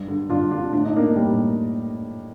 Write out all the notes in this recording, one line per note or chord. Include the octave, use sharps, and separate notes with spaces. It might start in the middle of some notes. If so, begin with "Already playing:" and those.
Already playing: G2
D3
G2 D4 F4
D3 D4 F4
A2 D4
D#4
A#3 D4
A2 G3 A#3